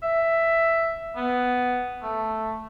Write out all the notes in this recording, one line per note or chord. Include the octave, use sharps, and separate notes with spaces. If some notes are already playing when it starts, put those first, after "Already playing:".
E5
B3
A3